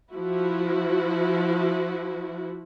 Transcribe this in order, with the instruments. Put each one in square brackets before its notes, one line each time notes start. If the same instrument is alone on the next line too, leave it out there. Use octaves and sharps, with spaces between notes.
[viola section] F3 E4 F#4